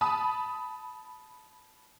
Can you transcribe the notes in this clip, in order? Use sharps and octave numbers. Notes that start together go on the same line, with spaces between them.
A5 B5 D#6